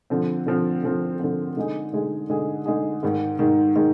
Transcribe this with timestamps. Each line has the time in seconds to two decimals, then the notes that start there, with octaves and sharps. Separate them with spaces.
0.10 D3 F3 C4
0.46 D3 F3 C4
0.83 D3 F3 C4
1.20 D3 F3 C4
1.57 D3 G#3 D#4 G#4
1.93 D3 G#3 D#4 G#4
2.30 D3 G#3 D#4 G#4
2.66 D3 G#3 D#4 G#4
3.03 G#2 D#3 G#3
3.39 G#2 D#3 G#3
3.76 D#3 G#3